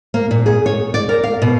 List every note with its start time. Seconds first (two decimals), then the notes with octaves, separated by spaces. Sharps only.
0.14 A#3
0.31 A#2
0.46 G#4
0.66 C#5
0.94 D5
1.09 A#4
1.23 F5
1.42 B2